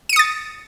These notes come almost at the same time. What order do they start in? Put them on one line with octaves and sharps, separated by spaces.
D#7 C#7 D#6 A6